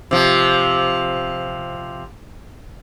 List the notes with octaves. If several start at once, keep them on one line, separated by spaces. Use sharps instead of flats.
C3 F3